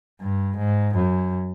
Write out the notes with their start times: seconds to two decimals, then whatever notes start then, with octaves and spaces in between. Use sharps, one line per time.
0.21 G2
0.58 G#2
0.95 F#2